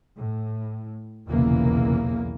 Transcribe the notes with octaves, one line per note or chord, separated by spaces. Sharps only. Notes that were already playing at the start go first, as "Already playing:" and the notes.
A2
F1 B1 E2 C#3 E3 A#3